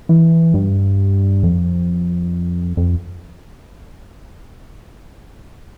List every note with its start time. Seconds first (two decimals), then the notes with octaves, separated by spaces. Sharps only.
0.09 E3
0.54 G2
1.43 F2
2.77 F2